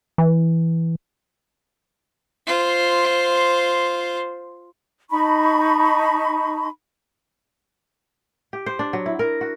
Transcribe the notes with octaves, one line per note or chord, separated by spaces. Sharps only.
E3
F4 C5
D#4 A5 B5 C#6
G4
C5
D4
F#3
E4
A#4
F#4